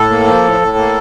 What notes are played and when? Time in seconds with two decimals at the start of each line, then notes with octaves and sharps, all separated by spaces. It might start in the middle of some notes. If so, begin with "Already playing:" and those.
Already playing: A2 A4
0.10 A#3
0.26 F3
0.44 A2
0.61 A2
0.77 A#3